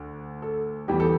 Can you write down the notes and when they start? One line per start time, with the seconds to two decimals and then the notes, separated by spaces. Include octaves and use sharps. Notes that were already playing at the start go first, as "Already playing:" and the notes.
Already playing: D2 D3
0.42 A4
0.88 E2 E3 G3 G4
1.00 A4